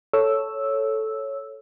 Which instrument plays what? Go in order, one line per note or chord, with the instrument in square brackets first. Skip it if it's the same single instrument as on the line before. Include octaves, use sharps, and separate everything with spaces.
[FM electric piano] A4 C#5 E6